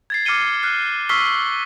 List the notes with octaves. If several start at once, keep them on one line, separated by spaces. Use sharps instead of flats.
G#6 A6 C7
D6 F6 C7 C#7 D#7 G7
F6 F#6 C7
C#6 E6 F6 B6 C7 G7